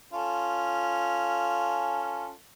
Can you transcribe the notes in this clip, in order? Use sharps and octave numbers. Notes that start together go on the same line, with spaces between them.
C#4 F4 A4